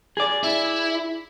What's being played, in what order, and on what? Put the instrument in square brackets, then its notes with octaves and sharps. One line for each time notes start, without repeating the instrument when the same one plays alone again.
[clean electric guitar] G#4 D5
[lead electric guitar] E4